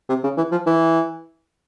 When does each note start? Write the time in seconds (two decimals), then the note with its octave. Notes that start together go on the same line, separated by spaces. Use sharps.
0.09 C3
0.24 C#3
0.37 E3
0.52 F3
0.66 E3